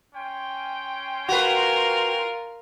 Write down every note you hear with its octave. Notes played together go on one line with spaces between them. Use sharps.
C#4 G5 C6
F4 F#4 A#4 B4 F7